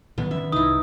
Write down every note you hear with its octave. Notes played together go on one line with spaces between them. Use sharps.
A2 D#3 F#3 B3
D#3 F3 C#4 E5
C2 G2 D#4 E4 D#6